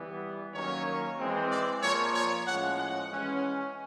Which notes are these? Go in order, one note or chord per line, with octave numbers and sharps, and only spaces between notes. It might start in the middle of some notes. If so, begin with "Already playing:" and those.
Already playing: E3 G3 B3
D#3 F#3 A#3 C#4 C#5
E3 G#3 C4
D5
A#2 F3 A#3 C#5
C#5
A2 F3 G#3 C#4 F#5
F#5
E3 G#3 C#4